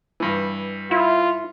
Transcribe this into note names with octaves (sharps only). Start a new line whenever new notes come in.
G2 E3
E4 F4